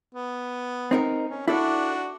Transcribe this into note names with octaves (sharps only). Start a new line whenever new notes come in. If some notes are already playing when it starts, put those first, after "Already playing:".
B3
C4 D#4 A#4
C#4
D4 E4 F#4 A4 D5